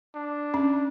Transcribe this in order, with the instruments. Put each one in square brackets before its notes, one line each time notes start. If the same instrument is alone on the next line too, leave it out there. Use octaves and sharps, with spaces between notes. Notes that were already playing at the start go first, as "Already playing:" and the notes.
[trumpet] D4
[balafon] C#4